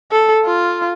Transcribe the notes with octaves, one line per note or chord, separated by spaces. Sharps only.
A4
F4